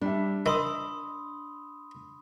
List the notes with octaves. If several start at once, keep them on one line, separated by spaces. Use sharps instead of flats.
G3 D4 E5
D#3 B5 C6 D#6 E6